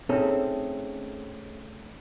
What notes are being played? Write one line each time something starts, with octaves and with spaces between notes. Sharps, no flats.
A3 C4 C#4 D#4 G#4 A4